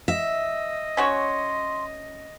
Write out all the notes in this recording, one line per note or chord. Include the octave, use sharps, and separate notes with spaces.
D#5 E5
C#4 F#4 C#5 C6